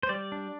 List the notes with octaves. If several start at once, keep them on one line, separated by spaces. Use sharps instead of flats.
C5
G3 D5
D4